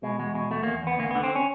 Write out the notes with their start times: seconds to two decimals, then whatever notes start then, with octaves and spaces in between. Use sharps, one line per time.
0.03 B2 G#3
0.19 E2 G#3
0.35 B2 G#3
0.51 E2 A3
0.63 E2 A#3
0.83 E2 B3
0.99 D2 A#3
1.11 D3 B3
1.23 C4
1.35 C#4